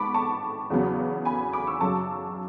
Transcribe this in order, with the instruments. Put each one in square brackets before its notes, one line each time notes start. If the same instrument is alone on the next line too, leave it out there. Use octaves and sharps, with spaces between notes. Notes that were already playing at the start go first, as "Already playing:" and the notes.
Already playing: [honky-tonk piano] G#2 B3 A5 B5 C#6 D6
A5 C#6
E2 C#3 F#3 B3
G#5 B5
B5 D6
C#6 E6
F#2 C#3 F#3 A5 C#6